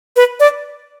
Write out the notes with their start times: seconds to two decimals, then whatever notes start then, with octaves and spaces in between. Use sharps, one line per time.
0.16 B4
0.40 D5